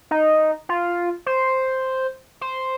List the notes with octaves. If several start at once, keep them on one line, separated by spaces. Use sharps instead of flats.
D#4
F4
C5
C5